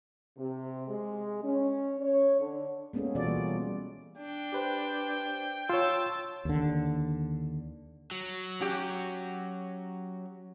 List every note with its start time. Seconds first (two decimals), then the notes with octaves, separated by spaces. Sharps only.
0.37 C3
0.88 G#3
1.44 C#4
2.00 C#5
2.39 D3
2.93 G#3 A#3 B3 C#4 G#4 A4
3.15 B2 E3 F4 F#4 A4 D5
3.26 G3 A#3
4.18 D4 G5
4.52 G4 B4 C5
5.69 F4 C#5 A5 C6 E6
6.45 D#2 D3
8.11 F#3
8.60 C#4 F#4 G4